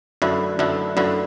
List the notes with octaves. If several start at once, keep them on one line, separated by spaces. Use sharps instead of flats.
F#2 D3 A3 E4 B4
F#2 D3 A3 E4 B4
F#2 D3 A3 E4 B4